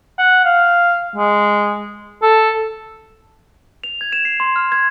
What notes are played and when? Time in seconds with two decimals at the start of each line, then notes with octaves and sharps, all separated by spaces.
0.18 F#5
0.45 F5
1.15 G#3
2.22 A4
3.84 F7
4.01 G#6
4.13 E7
4.25 C7
4.40 C6
4.56 F6
4.72 G#6